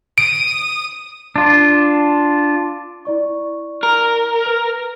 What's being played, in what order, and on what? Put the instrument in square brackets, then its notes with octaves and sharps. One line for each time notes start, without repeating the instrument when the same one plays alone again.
[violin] D#6 D#7 [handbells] D7
[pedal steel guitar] D4 F4
[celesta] E4 D5 C#6
[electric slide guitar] A#4
[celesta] B4 F6